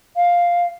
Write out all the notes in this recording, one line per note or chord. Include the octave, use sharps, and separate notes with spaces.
F5